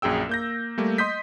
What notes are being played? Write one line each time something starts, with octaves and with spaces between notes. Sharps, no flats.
A#1 F#2 G#4 G5 E6
A#3 G6 A#6
G3 A3 A#3
D#5 C6 D#6 G6 B6